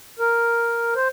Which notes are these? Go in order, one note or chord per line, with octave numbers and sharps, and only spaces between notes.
A#4
C5